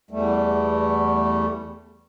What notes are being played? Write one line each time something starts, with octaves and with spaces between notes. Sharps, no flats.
E2 G3 A3